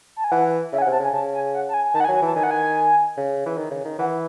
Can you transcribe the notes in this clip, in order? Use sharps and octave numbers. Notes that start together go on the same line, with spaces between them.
A5
G#5
E3 F#5
C#3 E5
G#5
F#5
C3
A5
C#3 G#5
C#3 A5
G#5
F#5
A5
G#5
G#5
D#3 A5
F#5
G#5
F#3
G#5
E3 A5
D#3 G#5
F#5
G#5
C#3
E3
D#3
C#3
D#3
E3 F#5